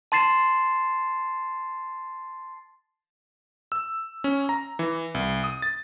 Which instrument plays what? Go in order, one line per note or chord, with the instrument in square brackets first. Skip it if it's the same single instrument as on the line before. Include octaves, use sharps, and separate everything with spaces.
[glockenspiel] A5 C6 A6 C7 E7
[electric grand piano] E6
C#4
A#5
E3
C2
D#6
A6